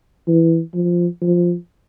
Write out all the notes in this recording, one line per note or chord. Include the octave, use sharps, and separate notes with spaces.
E3
F3
F3